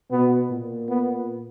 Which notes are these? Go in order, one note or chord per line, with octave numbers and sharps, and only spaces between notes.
B2 B3
A#2
B3